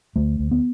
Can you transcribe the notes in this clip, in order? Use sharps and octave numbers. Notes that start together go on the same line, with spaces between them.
D2 A3
D2
B3